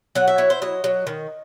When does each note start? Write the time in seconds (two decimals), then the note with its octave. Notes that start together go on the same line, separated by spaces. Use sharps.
0.15 F#3 F#5
0.28 E5
0.38 E4 C#5
0.50 C5
0.62 F#3 D#5
0.84 F#3
1.07 D#3